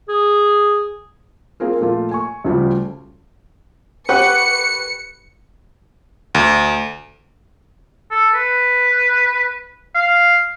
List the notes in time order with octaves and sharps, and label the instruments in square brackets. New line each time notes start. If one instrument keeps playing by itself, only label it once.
[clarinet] G#4
[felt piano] A#3 C4 F4 G#4 A#4
A#2 F3 A3 F4
G#5 C#6
D2 C#3 F3 G3
[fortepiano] G4 F#5 [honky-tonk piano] B4 C#6 F#6 [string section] C#7
[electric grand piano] D2
[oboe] A4
B4
F5